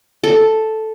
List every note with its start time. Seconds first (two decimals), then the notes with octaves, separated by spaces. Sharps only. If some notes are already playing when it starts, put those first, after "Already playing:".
0.24 A4